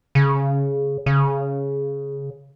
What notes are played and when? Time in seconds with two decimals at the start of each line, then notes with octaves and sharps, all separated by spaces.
0.15 C#3
1.06 C#3